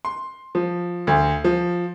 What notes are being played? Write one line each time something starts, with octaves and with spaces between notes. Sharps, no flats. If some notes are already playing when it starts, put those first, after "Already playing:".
C6
F3
D2
F3